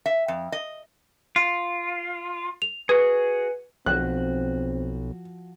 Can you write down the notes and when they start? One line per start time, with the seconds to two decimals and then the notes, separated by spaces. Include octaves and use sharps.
0.06 E5
0.28 F2
0.52 D#5
1.36 F4
2.62 F7
2.89 F#4 G#4 B4
3.86 B1 F3 C4 F#4 F#6